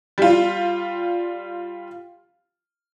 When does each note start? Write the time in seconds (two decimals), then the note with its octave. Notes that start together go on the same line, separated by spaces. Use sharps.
0.18 G3 F4